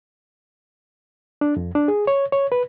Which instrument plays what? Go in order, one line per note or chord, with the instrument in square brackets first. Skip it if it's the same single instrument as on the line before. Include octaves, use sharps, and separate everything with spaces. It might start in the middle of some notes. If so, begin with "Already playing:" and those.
[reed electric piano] D4
F2
D4
G#4
C#5
C#5
B4